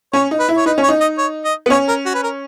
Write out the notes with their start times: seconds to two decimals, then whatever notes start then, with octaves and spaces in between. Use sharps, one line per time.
0.13 C#4 C#5
0.31 D#4
0.39 B4
0.49 E4
0.57 C#5
0.66 D#4 B4
0.78 C#4
0.83 C#5
0.88 D#4
1.00 D#5
1.18 C#5
1.45 D#5
1.66 B3
1.70 C#4 C#5
1.88 A#4
2.05 F#4
2.14 B4
2.23 A#4